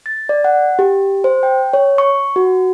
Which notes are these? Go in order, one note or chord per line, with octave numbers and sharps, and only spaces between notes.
A6
D5
F#5
G4
C5
G5
C#5
C#6
F#4